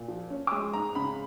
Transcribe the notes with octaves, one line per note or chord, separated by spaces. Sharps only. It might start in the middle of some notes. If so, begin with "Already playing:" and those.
Already playing: A#2
F3
C#4
D6
G#3 D#6
G#2 A#5
C#3 B5